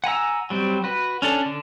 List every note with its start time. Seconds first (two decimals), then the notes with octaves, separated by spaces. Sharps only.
0.04 F#5 G#5 A#5 E6
0.50 F#3 G3 C4
0.84 F#4 B4
1.22 C#4 D4 A4
1.46 D3